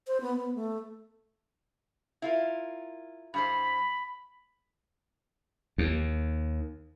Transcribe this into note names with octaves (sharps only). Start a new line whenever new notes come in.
C5
B3
B3
A3
E4 F4 A#4
G2 G3 C5 B5
D#2